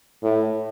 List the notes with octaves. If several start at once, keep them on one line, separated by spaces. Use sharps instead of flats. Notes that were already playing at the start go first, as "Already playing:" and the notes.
A2